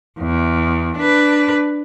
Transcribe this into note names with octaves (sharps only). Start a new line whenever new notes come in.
E2
D4 B4